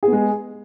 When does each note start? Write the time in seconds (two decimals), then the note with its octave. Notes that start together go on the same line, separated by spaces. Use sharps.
0.03 G#4
0.08 B3
0.13 G#3